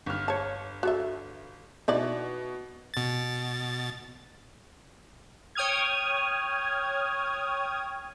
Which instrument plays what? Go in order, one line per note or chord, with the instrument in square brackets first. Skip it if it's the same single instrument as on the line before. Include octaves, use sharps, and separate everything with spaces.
[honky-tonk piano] G1 F6
[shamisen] C#5 A5
F#4 A4 E5
[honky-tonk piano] B2 [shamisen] D#4 E4 D5
[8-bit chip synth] B2 A6
[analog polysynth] C#5 G5 D#6 F6 G#6